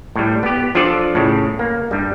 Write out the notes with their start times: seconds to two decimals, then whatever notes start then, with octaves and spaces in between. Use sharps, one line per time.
0.16 A2 G3
0.43 B3 G4
0.75 F3 D4 F4 A4 D5
1.15 A2 C#3
1.59 A#3
1.91 G2 G3